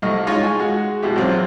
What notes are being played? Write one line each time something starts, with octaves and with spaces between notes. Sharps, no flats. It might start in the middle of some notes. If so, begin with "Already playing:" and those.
C2 A3 D#5 F6
G#3 C#4 D#4 F4 C#6
G#5
G#3 F#4
B2 G#3 E4 G4
B1 E2 C4 F4